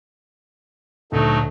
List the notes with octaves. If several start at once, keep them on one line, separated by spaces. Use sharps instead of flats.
D2 A#2 F#3 A3 D#4